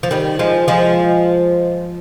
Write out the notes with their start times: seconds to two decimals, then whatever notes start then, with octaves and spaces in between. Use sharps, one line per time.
0.03 F3
0.11 D#3 G3
0.39 F3 G#3
0.68 F3 G#3